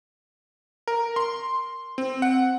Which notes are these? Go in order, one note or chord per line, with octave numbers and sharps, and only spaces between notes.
A#4
C6
C4
F#5